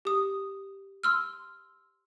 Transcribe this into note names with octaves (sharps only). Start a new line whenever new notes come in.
G4 D#6
C6 E6 F6